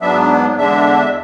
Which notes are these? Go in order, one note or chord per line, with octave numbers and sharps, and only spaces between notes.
G#2 F#3 B3 D4 E5
E2 D3 G#3 D4 E5